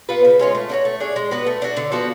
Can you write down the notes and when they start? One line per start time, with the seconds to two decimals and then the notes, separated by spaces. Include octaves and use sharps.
0.09 B3 F4 B4
0.25 C#3
0.39 G#3 C#4 F4
0.55 A3
0.69 D4 F#4 C#5
0.85 A3
1.00 D4 G#4 C#5
1.16 G#3
1.31 B3 F#4 B4
1.46 A3
1.62 D4 F#4
1.77 D3
1.92 F3 B3 F#4